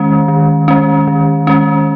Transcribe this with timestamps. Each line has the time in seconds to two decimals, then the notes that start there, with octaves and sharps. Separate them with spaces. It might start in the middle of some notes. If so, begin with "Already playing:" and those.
Already playing: D#3 G#3 C#4
0.28 D#3
0.68 G#3 C#4
1.07 D#3
1.47 G#3 C#4